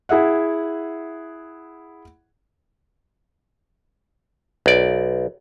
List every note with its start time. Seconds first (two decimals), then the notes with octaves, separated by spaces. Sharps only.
0.09 E4 G#4 E5 F#5
4.66 B1 D5